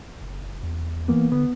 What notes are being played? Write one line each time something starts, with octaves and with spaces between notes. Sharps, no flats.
F#1
E2
E3 A#3 B3
D3 B3